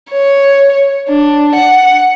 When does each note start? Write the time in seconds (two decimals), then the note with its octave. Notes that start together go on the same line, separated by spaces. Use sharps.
0.12 C#5
1.09 D4
1.55 F#5